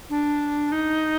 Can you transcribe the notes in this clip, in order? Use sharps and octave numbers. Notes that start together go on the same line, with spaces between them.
D4
D#4